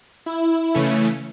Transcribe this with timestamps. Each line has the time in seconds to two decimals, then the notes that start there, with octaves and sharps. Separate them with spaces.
0.26 E4
0.75 C#3 E3 A3 C#4